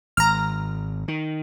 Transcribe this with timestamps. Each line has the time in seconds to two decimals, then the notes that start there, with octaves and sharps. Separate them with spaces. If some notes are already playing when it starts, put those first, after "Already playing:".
0.17 G#1 A#5 F6
1.08 D#3